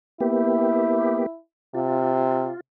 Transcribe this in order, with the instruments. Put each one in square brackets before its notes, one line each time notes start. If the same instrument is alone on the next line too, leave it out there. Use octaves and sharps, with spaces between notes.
[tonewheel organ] A#3 B3 G4 [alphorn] E4
[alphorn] C3 [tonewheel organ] F4